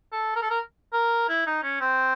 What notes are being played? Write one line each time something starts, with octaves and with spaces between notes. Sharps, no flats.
A4
A#4
A4
A#4
A#4
E4
D#4
C#4
C4